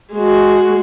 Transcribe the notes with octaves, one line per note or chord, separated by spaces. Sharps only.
G#3 F#4